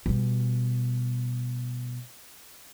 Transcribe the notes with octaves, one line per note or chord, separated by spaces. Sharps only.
B2 G3